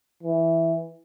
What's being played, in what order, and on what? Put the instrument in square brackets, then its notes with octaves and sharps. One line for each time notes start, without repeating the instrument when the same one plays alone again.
[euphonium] E3